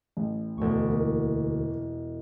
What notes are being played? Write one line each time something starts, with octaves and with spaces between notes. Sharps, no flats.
A1
E1 D2 C#6
E3 A#3